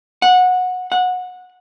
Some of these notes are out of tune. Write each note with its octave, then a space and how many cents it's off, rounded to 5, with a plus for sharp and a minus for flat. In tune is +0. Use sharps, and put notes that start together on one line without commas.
F#5 -20
F#5 -20